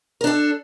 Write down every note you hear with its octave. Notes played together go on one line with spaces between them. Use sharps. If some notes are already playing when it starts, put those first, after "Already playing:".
D4 A4 A#4